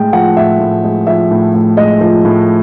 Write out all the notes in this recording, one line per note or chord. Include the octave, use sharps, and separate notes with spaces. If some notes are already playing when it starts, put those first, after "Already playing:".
Already playing: A2 G#3 G5
F3 F#5
A2 E5
A2
G#3
F3 E5
A2
A2
G#3 D#5
F3
A2